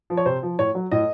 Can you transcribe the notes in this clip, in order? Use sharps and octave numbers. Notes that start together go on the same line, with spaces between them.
F3
C#5
C3 C5
F3
A2 C#5
F#3
A2 D#5